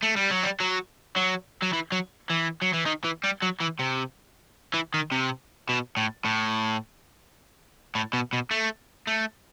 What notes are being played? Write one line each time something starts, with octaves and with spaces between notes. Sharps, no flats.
A3
G3
F#3
G3
F#3
F#3
F#3
E3
F#3
E3
F#3
E3
D#3
E3
G3
F#3
E3
C3
E3
D#3
C3
B2
A2
A2
A2
B2
B2
A3
A3